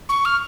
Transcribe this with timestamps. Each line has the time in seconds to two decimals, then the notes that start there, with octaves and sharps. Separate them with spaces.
0.09 C#6
0.25 F6